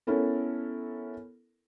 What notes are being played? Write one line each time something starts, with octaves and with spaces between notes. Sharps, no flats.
B3 C#4 E4 A4 A#4